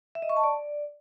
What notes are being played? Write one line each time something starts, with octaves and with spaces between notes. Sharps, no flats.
E5
D#5
C#6
A5
D5